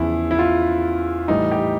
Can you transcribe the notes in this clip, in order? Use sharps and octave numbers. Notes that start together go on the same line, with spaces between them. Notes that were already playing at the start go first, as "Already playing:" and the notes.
Already playing: E2 C#3 F3 E4
E4
F4
A2 E3 G3 D#4
G4